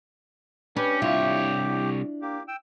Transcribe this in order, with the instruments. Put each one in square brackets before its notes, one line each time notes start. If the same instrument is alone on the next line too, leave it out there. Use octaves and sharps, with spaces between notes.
[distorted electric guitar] C#4 [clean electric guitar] D4 [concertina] G4 [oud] B4
[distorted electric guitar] C2 C#5 [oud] E4 F4
[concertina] A#3 G4
G5 E6